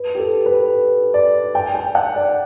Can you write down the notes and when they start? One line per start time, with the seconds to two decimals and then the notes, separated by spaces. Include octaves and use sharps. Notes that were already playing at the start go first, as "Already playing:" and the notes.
Already playing: B4
0.15 G4
0.20 A4
0.46 B4
1.14 D5
1.55 G5
1.75 G5
1.95 F#5
2.16 D5